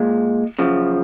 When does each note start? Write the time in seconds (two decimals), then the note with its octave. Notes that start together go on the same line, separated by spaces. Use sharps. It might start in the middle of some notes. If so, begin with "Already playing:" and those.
Already playing: A#2 G#3
0.59 F#2 C#3 F3